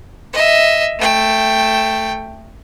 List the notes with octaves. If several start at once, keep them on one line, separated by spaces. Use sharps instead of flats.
D#5 E5
A3 G5